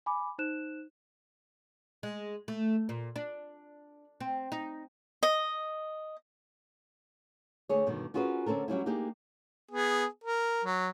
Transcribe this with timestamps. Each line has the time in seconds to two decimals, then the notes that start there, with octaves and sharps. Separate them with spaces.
0.06 G#5 B5 D6
0.38 D#4 C5 F#6 E7
2.03 G#3
2.48 A3
2.89 A#2
3.16 D4
4.20 C4
4.52 D#4
5.23 D#5
7.69 D2 D3 G#4 C#5
7.86 G2 B2 D3 D#3
8.14 C#4 F4 F#4 G#4 A#4 B4
8.46 D3 C4 C#4 A4 A#4
8.68 F#3 G3 C#4 E4
8.86 A#3 D4 D#4 G4 G#4
9.72 B3 G#4
10.24 A#4
10.65 F#3